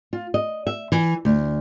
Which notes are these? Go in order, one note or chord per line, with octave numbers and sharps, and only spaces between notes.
F4
D#5
E5
E3
D2